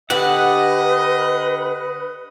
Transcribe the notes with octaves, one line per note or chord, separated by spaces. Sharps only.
D3 D4 G4 B4 D#5 F#5